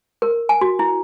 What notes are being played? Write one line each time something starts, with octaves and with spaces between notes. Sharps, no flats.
A#4
G#5
F#4
E4